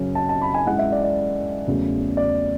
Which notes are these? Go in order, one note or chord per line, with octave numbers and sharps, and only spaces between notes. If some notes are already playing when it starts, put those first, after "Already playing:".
Already playing: F#2 C#3 F#3 C#4
A5
A5
B5
G#5
G#2 E3 G#3 C#4 F#5
E5
D5
D5
E2 C#3 F#3 A3 C#4
D5